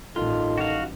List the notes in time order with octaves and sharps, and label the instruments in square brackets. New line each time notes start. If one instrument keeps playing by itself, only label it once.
[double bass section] A1 G2 [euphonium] D#3 [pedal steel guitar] F4 [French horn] A4
[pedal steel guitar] F#4 F5